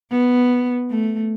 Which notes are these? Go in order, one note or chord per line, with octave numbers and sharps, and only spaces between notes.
B3
A3